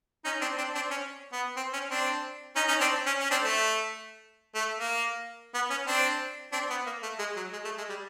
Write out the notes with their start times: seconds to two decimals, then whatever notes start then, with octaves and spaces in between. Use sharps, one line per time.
0.25 C#4 D#4
0.41 C4 D4
0.58 C4 D4
0.75 C4 D4
0.90 C#4
1.32 B3
1.56 C4
1.73 C#4
1.90 C4 D4
2.56 C#4 D#4
2.68 C#4 D#4
2.80 C4 D4
3.06 C#4
3.20 C#4
3.30 C4 D4
3.43 A3
4.55 A3
4.80 A#3
5.54 B3
5.70 C#4
5.87 C4 D4
6.52 C4 D4
6.70 B3
6.86 A#3
7.03 A3
7.19 G#3
7.36 F#3
7.52 G#3
7.64 A3
7.78 G#3
7.89 G3